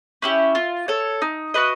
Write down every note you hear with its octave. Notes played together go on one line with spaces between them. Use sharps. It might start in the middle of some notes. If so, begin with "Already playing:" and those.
C#4 E4 G4
F4
A4 C#5
D#4
F#4 B4 D#5